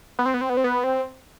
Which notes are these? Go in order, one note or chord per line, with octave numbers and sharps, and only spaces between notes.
B3
C4
B3
C4
B3
C4
B3
C4